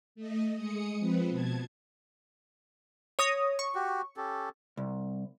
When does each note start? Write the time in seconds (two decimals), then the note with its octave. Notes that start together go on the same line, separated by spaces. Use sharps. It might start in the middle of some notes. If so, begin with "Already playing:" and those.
0.15 A3 D#5
0.55 G#3 D#6 C#7
0.99 F3 C4 B4
1.30 B2 A5 G#6
3.19 C#5 D#6 A#6
3.59 C#6
3.75 F#4 G4
4.17 C#4 G4 A4
4.77 C2